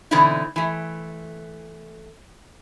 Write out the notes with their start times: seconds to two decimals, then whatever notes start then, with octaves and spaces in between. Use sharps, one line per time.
0.11 B2 D3 E3 C4 D#4 E4
0.56 E3 A3